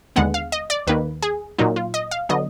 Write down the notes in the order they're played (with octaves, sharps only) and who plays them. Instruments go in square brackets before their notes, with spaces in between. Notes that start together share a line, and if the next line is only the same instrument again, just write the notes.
[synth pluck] D#2 D3 G#3 B3 F#5
F5
D#5
D5
D#2 D#3 A#3 B4
G#4
A#2 F#3 A#3 D#4
F4
D#5
F5
D3 F#3 B3 D#5